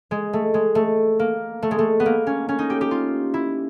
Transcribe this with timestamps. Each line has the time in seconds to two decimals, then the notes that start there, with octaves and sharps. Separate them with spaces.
0.11 G#3
0.33 A3
0.54 G#3
0.75 A3
1.19 A#3
1.62 A3
1.71 G#3
1.79 A3
2.00 B3
2.06 A#3
2.27 C#4
2.49 C#4
2.59 D#4
2.70 G4
2.81 G4
2.91 F4
3.34 E4